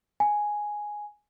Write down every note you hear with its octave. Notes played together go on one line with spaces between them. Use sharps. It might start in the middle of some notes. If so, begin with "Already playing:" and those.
G#5